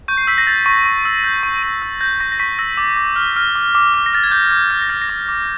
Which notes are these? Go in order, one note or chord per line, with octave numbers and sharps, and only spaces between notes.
C#6 G6
C7
E6 B6
A#6
G6 A6
C#6
C#6
E6
G6
C#6
C#6
E6
G6 A#6
C#6 A#6
A#6
C#6 B6
E6 A#6
D6 A6
D6
F6
F6
D6
D6
F6
A#6
F6 A6
G#6
D6 G6
D6 G6
F6 G#6
A#6
F6 A6
A#6
D6 A6
D6